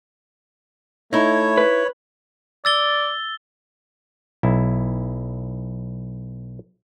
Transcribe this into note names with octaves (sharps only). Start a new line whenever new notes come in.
A3 D#4 E4 C#5
B4
D5 E6 A6 G7
B1 E4